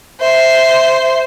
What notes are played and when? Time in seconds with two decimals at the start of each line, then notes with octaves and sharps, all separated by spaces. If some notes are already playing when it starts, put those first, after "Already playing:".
0.21 C5 E5